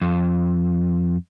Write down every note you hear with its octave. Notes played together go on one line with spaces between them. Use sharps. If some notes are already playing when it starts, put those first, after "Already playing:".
F2